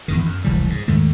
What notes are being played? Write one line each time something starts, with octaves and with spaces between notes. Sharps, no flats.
E2 G#2 D#3
F#2
F1 C#2 E3 G3
G#2
D#2 G#2 D#3 A3